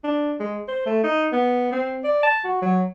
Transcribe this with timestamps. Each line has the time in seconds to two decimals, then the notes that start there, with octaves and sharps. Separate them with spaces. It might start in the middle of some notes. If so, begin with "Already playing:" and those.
0.04 D4
0.40 G#3
0.68 C5
0.86 A3
1.04 D#4
1.32 B3
1.72 C4
2.04 D5
2.23 A5
2.44 F#4
2.62 F#3